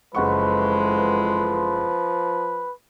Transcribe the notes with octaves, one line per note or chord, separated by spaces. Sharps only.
F#1 F2 E3 F3 G#3 B4 F#5 C#6